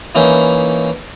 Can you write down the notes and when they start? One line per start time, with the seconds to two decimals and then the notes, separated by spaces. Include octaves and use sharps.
0.15 E3 A#3 C#4 D#4 E4